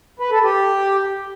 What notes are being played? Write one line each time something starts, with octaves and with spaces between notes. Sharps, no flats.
B4
A4
G4